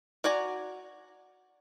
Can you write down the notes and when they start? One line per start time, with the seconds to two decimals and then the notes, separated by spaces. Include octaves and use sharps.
0.24 F#4 D5 G#5 A#5